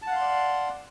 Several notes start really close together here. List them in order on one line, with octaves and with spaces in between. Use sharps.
A5 F#5 F5 C6 D5